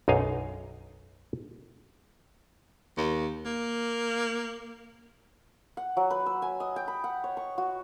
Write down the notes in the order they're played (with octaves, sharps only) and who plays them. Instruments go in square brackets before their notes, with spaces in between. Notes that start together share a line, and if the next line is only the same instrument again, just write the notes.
[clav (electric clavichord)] B1 F#2 D#4 D#5 F5 G#5
[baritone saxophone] D#2
A#3
[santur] F#5
F#3
B4
E6
G#5
D#5
G5
B5
F#5
C#5
C#6
F#4